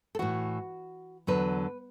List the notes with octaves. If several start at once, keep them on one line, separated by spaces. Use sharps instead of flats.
A4
A2 E3 F#4
E2 D3 F#3 B4